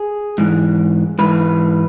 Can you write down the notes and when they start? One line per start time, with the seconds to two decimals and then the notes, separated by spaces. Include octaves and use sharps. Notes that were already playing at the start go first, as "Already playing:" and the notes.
Already playing: G#4
0.38 G#2 E3
1.19 G#2 E3 B4